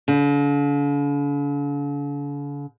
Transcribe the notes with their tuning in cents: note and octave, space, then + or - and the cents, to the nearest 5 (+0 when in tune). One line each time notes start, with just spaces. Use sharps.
D3 -45